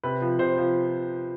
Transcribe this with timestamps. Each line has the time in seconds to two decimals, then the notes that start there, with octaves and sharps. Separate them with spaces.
0.04 C3 B4
0.22 F3
0.39 C3 C5
0.57 F3